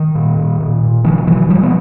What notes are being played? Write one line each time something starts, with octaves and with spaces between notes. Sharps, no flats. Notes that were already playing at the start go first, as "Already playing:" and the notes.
Already playing: D#3
A#2
A#2
A#2
A#2
B2 D#3 F3
B2 E3 F#3
B2 F3 G3
B3